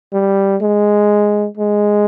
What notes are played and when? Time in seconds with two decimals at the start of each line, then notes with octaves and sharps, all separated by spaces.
0.13 G3
0.62 G#3
1.57 G#3